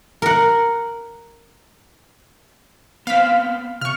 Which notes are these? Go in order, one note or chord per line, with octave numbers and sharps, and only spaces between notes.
A#4 F#5
B3 C4 C5 F5 B6
C3 C#6 F6